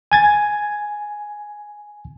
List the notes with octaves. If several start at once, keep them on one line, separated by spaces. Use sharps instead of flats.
G#5 G#6 A6